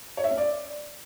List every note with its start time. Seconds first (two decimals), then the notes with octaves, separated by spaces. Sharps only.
0.17 C#5
0.24 E5
0.31 C#4
0.38 D5